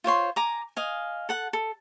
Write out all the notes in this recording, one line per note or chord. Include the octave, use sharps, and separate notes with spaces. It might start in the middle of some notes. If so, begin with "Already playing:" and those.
F4 C5 C#5 C6
G#5 A#5 D6
D#5 F5 G#5
A4 F#5 A5
A4